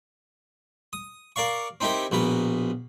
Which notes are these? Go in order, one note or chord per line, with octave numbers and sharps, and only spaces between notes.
D#6
A#4 D5 F5 C#6
C4 D#4 E4 G4 A#4
A#1 B2 B4 A#5